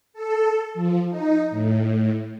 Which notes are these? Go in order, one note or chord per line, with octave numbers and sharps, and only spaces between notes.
A4
F3
D#4
A2